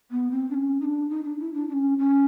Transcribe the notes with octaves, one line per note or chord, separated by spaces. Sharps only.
B3
C4
D4
C#4
D#4
D4
D#4
D4
E4
D4
D4
C#4
C#4